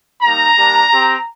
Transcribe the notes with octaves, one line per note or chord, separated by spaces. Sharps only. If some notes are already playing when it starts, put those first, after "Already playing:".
G3 A#3 D#4 A#5
G3 A#3 D4 G4
C4 G4